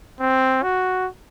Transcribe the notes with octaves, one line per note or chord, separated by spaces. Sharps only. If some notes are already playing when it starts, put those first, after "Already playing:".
C4
F#4